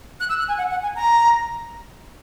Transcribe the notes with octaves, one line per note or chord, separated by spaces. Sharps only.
F#6
E6
F#6
G#5
F#5
F#5
G#5
A#5